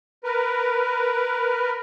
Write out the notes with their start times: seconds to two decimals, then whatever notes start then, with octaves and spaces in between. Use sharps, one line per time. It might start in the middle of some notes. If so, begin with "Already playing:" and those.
0.24 A#4 B4